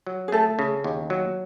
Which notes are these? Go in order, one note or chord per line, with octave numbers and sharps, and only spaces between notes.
F#3
G#4
A3 A4
C#3
D#2
F#3